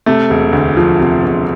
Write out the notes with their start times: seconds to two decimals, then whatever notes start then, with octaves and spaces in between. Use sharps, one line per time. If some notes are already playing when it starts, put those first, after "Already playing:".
0.06 C3 A3
0.30 E1
0.53 D2
0.77 F3
0.99 C3
1.23 E1